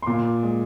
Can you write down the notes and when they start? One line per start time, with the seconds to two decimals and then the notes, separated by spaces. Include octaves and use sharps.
0.02 C6
0.06 A#2 D6
0.43 G#3